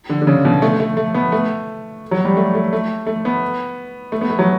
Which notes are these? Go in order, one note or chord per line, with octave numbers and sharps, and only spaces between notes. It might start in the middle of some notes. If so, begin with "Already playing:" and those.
D3
D3
C#3
B2
A3
A3
A3
B3
A3
F#3
G3
A3
A3
A3
A3
B3
A3
B3
A3
F#3